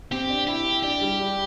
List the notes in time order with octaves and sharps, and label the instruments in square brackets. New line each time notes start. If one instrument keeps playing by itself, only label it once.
[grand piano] C4 [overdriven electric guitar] G4
[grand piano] D4
[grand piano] E4 [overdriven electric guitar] G4
[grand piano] E4
[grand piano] D4 [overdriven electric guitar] G4
[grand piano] G3
G3